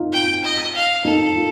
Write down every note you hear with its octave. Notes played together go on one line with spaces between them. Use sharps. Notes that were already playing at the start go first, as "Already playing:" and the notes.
Already playing: D#4 F4
G5
D#5
F5
D#4 A4
F4